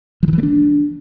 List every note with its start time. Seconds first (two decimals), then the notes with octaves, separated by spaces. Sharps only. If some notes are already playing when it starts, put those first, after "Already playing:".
0.23 F3
0.28 D#3
0.33 E3
0.38 A3
0.43 D4